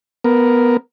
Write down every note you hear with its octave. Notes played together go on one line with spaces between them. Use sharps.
B3 A#4